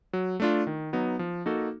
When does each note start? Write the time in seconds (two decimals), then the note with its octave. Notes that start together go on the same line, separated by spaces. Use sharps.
0.13 F#3
0.40 A3 D4 F4
0.67 D#3
0.93 F#3 B3 D#4
1.19 F3
1.46 A#3 D#4 F#4 A4